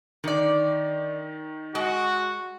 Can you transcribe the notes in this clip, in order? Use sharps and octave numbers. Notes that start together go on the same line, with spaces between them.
D3 D#3 D#4 D5
G#3 F#4